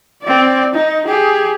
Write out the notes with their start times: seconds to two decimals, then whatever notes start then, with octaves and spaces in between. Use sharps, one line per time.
0.22 C4 D5
0.75 D#4 D#5
1.06 G4 G#4